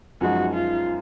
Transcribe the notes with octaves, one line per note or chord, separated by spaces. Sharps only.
F#2 F3 G#3 D#4 F#4
F4